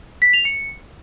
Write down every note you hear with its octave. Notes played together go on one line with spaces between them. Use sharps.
B6
F7
C#7